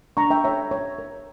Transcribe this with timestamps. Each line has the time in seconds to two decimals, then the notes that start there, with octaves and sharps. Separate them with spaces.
0.17 D4 A#5 C#6
0.30 E5 G5
0.44 C#5 E5 G5
0.71 C#5
0.99 A#4